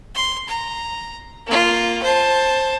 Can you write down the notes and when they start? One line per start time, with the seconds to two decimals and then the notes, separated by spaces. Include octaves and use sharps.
0.15 C6
0.48 A#5
1.47 A#3 F4
2.02 C5 A5